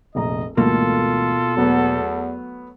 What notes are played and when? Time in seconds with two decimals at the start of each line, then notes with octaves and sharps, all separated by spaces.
0.15 F1 A#1 D#5 A#5
0.57 D2 G#2 B2 E3 A#3 F4 A4
1.57 E2 F#3 A3 B3